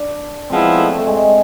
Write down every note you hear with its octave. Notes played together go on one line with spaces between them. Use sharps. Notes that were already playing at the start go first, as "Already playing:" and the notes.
Already playing: D4
F3 G#3 B3 C4 E4
A3
A3
G#3